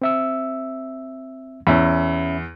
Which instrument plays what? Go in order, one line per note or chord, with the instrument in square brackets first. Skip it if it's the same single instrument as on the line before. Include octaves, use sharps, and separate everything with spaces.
[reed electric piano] C4 E5 E6
[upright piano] E2 [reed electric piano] C#4 E5 B5